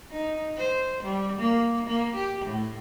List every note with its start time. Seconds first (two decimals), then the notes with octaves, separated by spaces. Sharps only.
0.11 D#4
0.57 C5
1.03 G3
1.38 A#3
1.87 A#3
2.16 G4
2.45 A2